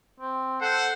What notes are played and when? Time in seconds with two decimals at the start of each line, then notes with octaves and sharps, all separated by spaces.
0.20 C4
0.61 A4 C5 F#5